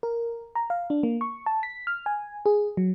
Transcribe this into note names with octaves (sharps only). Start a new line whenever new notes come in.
A#4
A#5
F5
D4
A#3
C#6
A5
B6
F6
G#5
G#4
F#3